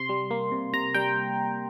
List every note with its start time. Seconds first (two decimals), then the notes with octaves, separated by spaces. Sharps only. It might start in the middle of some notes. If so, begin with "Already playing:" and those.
Already playing: C3 C6
0.09 G3
0.31 A#3
0.52 C3
0.73 C3 A#5
0.94 G3 G5